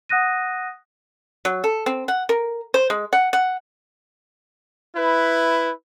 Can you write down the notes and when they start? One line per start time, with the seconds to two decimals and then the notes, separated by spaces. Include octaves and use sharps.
0.09 F#5 D#6 F#6 A#6 D#7
1.45 F#3
1.64 A4
1.86 C4
2.08 F#5
2.29 A#4
2.74 C5
2.90 G#3
3.13 F#5
3.33 F#5
4.96 E4 B4